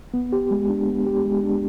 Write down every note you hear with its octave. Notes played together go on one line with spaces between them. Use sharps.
B3
G4
G#3
D4
B3
G4
G#3
D4